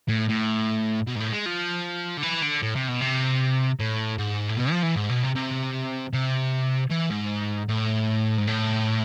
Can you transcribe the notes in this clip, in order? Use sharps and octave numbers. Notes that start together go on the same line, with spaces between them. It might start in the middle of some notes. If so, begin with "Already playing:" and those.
A2
A2
B2
G#2
A2
G#3
F3
D3
E3
D3
A2
C3
B2
C3
A2
G#2
A2
B2
F3
E3
G#2
B2
C3
C3
C3
E3
G#2
A2
G#2
A2